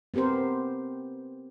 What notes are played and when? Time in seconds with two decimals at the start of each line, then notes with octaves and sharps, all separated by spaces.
0.14 B3 C4 G4 A#4 C5